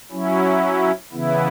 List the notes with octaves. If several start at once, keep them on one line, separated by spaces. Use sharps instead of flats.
F#3 C#4 E4
C#3 E3 B3 E4